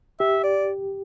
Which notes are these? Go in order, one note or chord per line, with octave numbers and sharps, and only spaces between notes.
G4 E5
D5